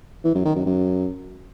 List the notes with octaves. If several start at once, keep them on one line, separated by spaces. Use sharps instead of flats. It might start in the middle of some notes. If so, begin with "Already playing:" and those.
E3
F#2
D#3
F#2
F#2